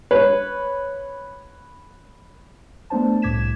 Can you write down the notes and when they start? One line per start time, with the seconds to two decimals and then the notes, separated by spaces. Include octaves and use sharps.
0.11 B4 C#5
2.90 A3 B3 D4 C5 A5
3.22 C2 A2 D6 G#6 B6 E7